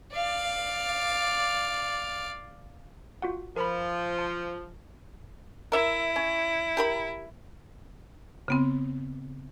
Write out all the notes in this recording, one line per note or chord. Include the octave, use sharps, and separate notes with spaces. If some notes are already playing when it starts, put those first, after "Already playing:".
D5 F5
F4 F#4 F#5
F3 A#4 B5
A5
E4 A#4 E5
C#4
G4 A#4 B5
C#3 B3 C4